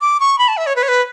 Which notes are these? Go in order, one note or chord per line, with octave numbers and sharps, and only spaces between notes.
D6
C#6
B5
A5
E5
C#5
B4
C#5
B4